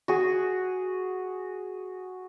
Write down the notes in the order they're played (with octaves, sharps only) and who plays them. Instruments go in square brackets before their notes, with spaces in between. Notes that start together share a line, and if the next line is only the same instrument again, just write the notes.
[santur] F#4 G#4